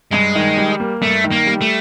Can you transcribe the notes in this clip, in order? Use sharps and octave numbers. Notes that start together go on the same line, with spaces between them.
G2 G#3
D#3
G3
A#3
G2 A3
D#3
A#3
G3
A3